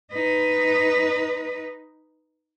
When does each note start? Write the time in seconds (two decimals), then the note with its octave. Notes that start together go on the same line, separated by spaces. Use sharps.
0.12 D#4 B4